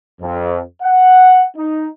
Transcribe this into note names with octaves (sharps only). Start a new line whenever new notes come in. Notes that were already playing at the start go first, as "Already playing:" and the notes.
F2
F#5
D#4